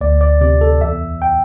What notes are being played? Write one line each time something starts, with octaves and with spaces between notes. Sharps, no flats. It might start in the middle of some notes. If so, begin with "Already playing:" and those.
D2 D5
D5
C3 D5
A4
E2 E5
G5